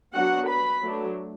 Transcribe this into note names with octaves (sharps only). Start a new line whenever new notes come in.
F#3 B3 D4 F#4 F#5
B4 B5
F#3 A3 D4